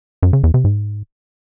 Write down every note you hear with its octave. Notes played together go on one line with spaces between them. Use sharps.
F#2
C#3
E2
C3
G#2